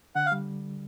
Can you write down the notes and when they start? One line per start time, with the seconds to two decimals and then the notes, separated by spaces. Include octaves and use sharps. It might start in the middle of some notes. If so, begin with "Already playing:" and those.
0.15 D3 F#5
0.26 F5
0.32 G3